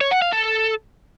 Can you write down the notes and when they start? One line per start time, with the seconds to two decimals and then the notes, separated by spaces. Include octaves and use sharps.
0.01 C#5
0.11 F#5
0.22 F5
0.33 A4